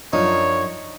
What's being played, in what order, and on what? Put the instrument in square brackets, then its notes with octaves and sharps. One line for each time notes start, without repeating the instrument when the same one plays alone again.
[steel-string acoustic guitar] F#2 F3 D4 [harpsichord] D#4 [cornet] C#5